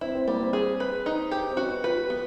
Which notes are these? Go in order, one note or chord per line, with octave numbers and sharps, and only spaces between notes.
C4 E4
C4
G3 A#3
C4
G#4
B4
D#4
G4
C4
C#4 F#4
B3
F4 B4
G4
B3